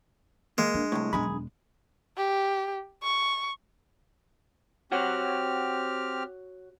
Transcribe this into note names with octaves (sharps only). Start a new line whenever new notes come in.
G#3 A#3
D4
C2 F2 A2
E1 F#2 D4 G#4 B5
G4
C#6
C4 F#4 G4 C#5 F#5 F6